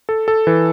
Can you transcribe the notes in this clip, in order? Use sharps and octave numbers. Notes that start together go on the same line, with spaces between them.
A4
A4
E3